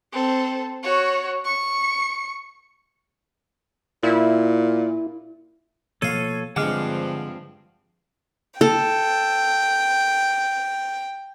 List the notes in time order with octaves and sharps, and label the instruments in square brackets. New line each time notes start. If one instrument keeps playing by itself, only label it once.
[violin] C4 A4
F#4 C#5
C#6 C#7
[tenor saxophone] A#2 [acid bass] E4
[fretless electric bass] B2 F3 A#3 [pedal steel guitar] A4 C#5 [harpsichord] F5 D#6
[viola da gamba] G2 F3 C4 [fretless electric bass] D3 [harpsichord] G#3 [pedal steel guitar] F#5 D6 F6
[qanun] A4 [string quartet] G5